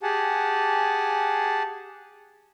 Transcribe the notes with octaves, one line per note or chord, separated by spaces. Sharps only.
G4 G#4 F#5 G#5 A5